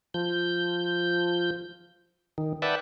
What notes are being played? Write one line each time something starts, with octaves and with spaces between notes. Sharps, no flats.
F3 G6
D#3
B4 D5 E5 F#5 G5 A5